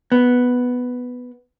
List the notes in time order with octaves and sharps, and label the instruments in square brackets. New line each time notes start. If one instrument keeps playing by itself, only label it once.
[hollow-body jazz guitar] B3